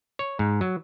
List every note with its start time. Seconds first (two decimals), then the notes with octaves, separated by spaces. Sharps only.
0.19 C#5
0.39 G#2
0.61 F#3